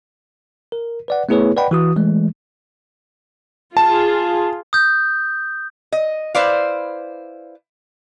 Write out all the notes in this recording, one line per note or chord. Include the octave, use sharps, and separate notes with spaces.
A#4
B4 D5 F#5
A3 B3 E4 G#4 B4 C#5
B4 D5 D#5 F#5 G5 B5
E3 F#4 D#6
E3 G#3 A3
F4 G#4 A5
D#6 G6
D#5
E4 B4 C5 D5 F5